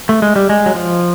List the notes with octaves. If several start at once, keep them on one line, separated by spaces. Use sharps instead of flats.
A3
G#3
G3
G#3
F#3
F3